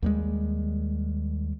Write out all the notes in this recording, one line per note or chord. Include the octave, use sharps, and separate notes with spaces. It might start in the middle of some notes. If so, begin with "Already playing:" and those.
D#2 G3 G#3